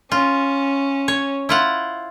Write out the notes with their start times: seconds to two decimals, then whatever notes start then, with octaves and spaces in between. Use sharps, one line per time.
0.12 C#4 F4
1.08 C#5
1.49 E4 F4 F#5